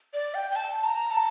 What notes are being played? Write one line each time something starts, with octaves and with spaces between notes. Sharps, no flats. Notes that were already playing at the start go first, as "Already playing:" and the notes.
D5
G5
G5
A5
A#5
A5